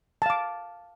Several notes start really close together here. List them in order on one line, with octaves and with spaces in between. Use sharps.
A5 F5 D6